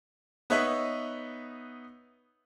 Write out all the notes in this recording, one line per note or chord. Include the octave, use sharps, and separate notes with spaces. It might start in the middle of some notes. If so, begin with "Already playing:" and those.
B3 D#4 B4 C#5 E5